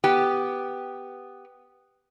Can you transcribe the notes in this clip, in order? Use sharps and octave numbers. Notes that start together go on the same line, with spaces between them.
B3 G4